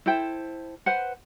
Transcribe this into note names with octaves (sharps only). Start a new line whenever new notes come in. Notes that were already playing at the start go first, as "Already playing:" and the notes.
E4 A4 C5 G5
B4 C5 F#5